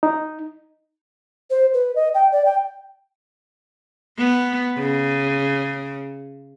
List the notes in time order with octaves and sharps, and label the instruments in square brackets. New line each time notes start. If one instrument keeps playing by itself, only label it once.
[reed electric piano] D#4
[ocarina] C5
B4
D#5
G5
D5
G5
[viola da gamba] B3
C#3